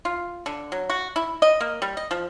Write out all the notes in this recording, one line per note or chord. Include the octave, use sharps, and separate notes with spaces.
F4
D3
F#3
F#4
E4
D#5
A#3
G3
D#5
F3